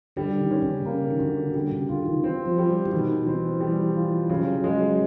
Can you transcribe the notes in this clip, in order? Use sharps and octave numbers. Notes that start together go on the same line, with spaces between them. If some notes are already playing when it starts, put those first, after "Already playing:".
D3 G3
D#3
C#4
C#3
C#3 A#3
D#3
D3 F#4
D3 G3
C#3
D3 F4
D#3
C4
F3
G3
E3
B2 D#3
E3 C4
G3
F4
C#3 F#3
F#3 G#3